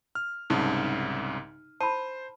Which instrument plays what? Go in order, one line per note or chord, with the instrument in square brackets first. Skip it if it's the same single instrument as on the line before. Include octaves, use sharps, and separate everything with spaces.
[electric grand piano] F6
[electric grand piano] C2 G#2 C#3 [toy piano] D#4
[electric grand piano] C5 [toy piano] A5 B5